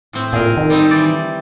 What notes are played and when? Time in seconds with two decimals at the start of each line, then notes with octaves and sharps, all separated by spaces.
0.13 A2 C4
0.33 A#2 G#4 A#4
0.57 D#3
0.70 G3 C4 D#4
0.91 E3 D5